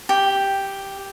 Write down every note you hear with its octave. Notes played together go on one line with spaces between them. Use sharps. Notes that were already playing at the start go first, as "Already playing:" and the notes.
G4